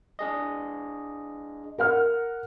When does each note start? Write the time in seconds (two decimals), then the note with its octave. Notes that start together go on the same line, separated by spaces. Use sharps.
0.19 D4 G#4 D#5
1.78 A#4 F#5 F6